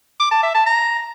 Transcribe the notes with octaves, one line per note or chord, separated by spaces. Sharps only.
D6
A5
E5
A5
A#5